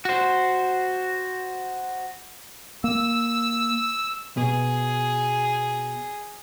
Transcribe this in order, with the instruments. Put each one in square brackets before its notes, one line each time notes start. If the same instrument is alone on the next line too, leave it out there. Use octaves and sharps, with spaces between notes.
[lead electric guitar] F#4 C5
[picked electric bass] A#3 [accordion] E6
[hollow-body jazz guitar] B2 [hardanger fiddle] G#4